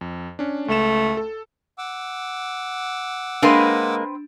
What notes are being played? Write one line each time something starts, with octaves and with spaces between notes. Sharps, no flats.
F2
C#4 D4
C#2 A3 E7
A4
F#5 D6 E6
G#3 A#3 C4 D4 B4 C6